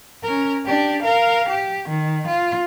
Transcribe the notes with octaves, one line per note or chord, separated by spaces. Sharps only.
C#4 A#4
D4 G4
A#4 F5
G4
D#3
F4